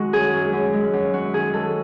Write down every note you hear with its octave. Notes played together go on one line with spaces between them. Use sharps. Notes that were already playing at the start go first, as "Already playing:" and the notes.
Already playing: D#3 G#3 F#4
F#2 G#4
F#2
F#2
G#3
F#2
F#2 F#4
D#3 G#4
G#3 A4